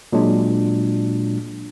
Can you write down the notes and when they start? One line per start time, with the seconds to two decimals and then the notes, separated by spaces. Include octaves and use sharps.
0.13 A#2 F#3 G#3 D4